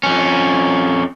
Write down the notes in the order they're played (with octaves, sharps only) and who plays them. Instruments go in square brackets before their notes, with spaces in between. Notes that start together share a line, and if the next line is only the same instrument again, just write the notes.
[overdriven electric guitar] F2 C#4